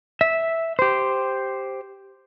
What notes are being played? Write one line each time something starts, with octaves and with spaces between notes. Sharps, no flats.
E5
G4 C5